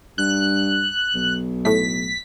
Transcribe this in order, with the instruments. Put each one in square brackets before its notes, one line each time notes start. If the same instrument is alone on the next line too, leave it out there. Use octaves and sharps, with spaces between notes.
[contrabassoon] G2 [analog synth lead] F#6
[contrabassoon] B1
[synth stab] A2 A3 [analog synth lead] B6